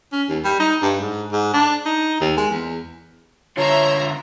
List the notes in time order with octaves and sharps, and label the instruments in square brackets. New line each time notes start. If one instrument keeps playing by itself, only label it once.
[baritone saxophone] C#4
D#2
G3
D#4
G2
G#2
G#2
D4
D#4
D#2
G#3
E2
[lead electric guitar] D3 F4 [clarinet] C#5 [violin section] E5 A#5 C6